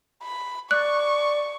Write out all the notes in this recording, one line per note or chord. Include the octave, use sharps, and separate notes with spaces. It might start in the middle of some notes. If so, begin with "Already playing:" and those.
B5
D5 C#6 F#6